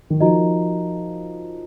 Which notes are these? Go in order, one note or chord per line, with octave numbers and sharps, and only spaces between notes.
D#3
F3 D#4 F#4 A#4 D#5 A#5